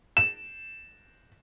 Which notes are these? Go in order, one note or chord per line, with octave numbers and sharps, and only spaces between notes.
E7